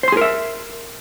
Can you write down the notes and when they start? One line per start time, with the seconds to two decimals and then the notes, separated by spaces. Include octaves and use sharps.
0.03 C5
0.08 C6
0.12 G#4
0.17 A#4
0.21 E5